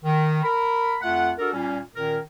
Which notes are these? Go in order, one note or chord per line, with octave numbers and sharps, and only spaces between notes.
D#3
A#4 B5
F2 A3 F4 F#5
D4 F#4 A4 A#4
A#2 G3 C#4
A#2 D#3 C#4 A#4